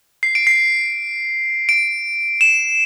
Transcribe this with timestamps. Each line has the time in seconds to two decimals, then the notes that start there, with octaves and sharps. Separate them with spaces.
0.23 C7
0.35 D7
0.47 C7
1.69 D7
2.41 E7